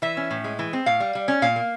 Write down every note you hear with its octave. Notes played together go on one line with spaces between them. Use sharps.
E3 E5
C#4
A2
G#3
E3
C4
A2 F5
G3
G3
C#4
A#2 F5
A#3